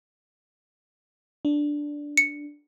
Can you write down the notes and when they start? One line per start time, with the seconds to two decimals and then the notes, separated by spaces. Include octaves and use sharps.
1.45 D4
2.17 C#7